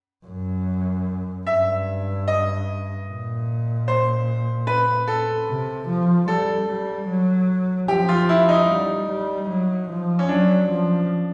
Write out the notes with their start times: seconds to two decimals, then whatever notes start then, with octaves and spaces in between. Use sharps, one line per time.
0.26 F#2
1.47 G2 E5
2.28 D#5
3.08 A#2
3.88 C5
4.67 B4
5.08 A4
5.47 C3
5.88 F3
6.28 G3 A4
6.68 G3
7.08 F#3
7.88 F3 G4
8.09 F4
8.29 E4
8.48 D#4
8.69 G3
9.09 G3
9.49 F#3
9.89 F3
10.19 C#4
10.29 F#3 D4
10.70 F3